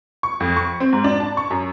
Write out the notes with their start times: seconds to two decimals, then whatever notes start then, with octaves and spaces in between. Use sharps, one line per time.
0.23 C#6
0.40 F2
0.57 C#6
0.80 C4
0.93 G#2
1.04 D4
1.20 A5
1.37 C#6
1.51 F#2